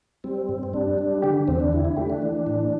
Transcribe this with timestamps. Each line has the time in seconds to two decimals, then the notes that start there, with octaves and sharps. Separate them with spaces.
0.24 G3 C4
0.49 G2
0.63 C4
0.73 G3 D4
0.98 G3
1.22 D3 G4
1.48 E2 C4
1.60 D4
1.73 D3 E4
1.85 E4
1.97 A3 G4
2.10 D4
2.22 E3
2.47 A2